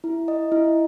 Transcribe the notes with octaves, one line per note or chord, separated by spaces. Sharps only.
E4
D#5
E4